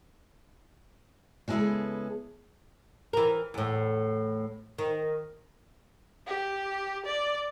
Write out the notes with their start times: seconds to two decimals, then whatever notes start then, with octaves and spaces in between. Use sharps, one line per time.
1.48 C#3 G#3 B3 E4 G#4 A4
3.13 E3 A#4
3.54 E2 A2
4.78 D#3
6.27 G4
7.06 D5